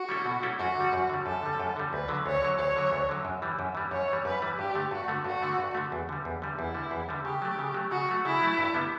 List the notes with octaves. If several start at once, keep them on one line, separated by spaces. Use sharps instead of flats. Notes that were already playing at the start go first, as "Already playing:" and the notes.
Already playing: F#4
G3 C#4 E4 A4
B2
G3 C#4 E4 A4
F#2 F#4
D3 G3
F#2
D3 G3
F#2 A4
D3 G3
F#2
D3 G3
D2 B4
D3 F#3
D2 C#5
D3 F#3
D2 C#5
D3 F#3
D2
D3 F#3
F#2
E3 G3
F#2
E3 G3
F#2 C#5
E3 G3
F#2 B4
E3 G3
G2 G4
D3 A3
G2 F#4
D3 A3
G2 F#4
D3 A3
G2
D3 A3
E2
D3 G3
E2
D3 G3
E2 E4
D3 G3
E2
D3 G3
C#3 G4
F#3 A3
C#3
F#3 A3
C#3 F#4
F#3 A3
C#3 E4
F#3 A3
G2
D3 G3 B3